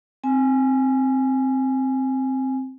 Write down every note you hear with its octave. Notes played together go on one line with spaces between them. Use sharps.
C4 G#5